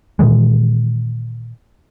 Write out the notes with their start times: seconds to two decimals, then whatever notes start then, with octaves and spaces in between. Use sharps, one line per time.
0.19 A#2 D#3 E3 G#3